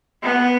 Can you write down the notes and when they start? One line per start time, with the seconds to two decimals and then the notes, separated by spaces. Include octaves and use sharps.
0.23 B3